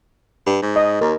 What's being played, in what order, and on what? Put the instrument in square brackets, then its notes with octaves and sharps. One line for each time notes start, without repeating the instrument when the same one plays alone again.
[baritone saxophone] G2
G#2
[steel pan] D#5
[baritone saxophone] D#2 [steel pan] A#4